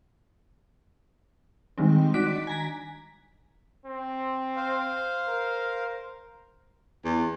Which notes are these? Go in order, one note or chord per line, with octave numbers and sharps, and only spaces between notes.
D#3 G3 G#3 C4
D#3 D4 F#4 B6 D7
G#5 A#5 B6
C4
C5 F5
A#4
E2